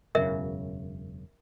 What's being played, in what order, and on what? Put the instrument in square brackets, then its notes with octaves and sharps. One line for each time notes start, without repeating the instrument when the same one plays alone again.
[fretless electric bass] E1 F#2 C#3 [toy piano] A#4 E5